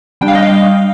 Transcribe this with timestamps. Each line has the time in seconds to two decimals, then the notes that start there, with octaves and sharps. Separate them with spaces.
0.21 G3 D4 G5
0.28 F5
0.35 D#5
0.43 F5